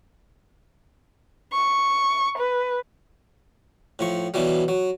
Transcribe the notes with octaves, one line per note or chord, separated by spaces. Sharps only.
C#6
B4
A2 F3 C#6
B2 E3 F#3 G3
F#3